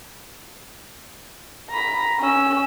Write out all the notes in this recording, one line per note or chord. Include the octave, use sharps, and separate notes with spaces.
A#5 B5
C#4 E6